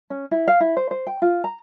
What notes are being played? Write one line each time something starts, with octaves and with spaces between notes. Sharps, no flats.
C#4
E4
F5
E4
C5
C5
G5
F4
A#5